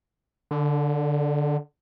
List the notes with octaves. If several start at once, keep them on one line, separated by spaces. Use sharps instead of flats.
D3